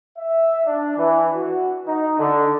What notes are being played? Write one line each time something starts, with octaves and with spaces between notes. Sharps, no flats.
E5
D4
E3
F#4
D#4
D3